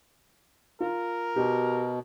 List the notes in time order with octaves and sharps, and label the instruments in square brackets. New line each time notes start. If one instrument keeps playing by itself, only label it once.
[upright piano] F4 [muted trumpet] A#4
[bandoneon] B2 [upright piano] F#4 G4